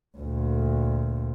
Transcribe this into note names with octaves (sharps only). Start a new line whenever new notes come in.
D2 A#2